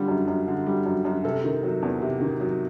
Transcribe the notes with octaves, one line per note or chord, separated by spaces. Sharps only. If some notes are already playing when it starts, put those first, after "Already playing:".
Already playing: D3 G3 F4
F#2
F#2
D3
G3
F#2
F#2
C3 A4
D#3
F#3
E2
C3
D#3
F#3